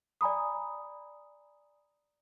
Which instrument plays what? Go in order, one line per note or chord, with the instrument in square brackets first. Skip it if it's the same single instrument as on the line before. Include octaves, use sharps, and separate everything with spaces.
[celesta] D5 G#5 A#5 B5 D#6